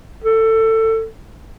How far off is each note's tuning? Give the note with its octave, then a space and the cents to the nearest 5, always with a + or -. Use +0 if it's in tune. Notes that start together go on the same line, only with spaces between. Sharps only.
A4 +20